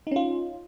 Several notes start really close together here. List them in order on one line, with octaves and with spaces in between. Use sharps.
D#4 C#4 F4